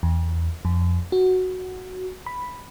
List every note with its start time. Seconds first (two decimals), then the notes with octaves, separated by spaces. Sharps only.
0.03 E2
0.65 F2
1.12 F#4
2.26 B5